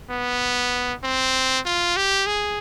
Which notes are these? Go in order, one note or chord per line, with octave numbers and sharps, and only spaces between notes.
B3
C4
F4
G4
G#4